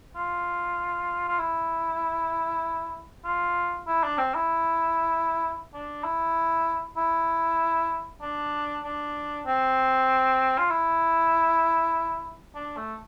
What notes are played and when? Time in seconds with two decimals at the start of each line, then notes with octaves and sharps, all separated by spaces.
0.16 F4
1.29 F4
1.39 E4
3.25 F4
3.88 E4
4.03 D4
4.18 C4
4.35 E4
5.74 D4
6.04 E4
6.97 E4
8.22 D4
8.84 D4
9.46 C4
10.59 F4
10.70 E4
12.56 D4
12.77 A3